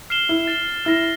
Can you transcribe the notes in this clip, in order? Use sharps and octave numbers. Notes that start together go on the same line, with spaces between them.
F6 C7 E7 G7
E4
A6 E7 G7
E4 F6 A#6 E7